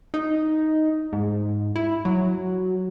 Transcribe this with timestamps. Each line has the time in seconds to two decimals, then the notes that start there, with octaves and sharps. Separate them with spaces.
0.14 D#4
1.13 G#2
1.76 E4
2.05 F#3